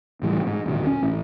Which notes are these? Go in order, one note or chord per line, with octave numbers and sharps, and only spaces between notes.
C#2 A2 E3 G3
G#2
D1 G#1 A#2 D3
C#4
A1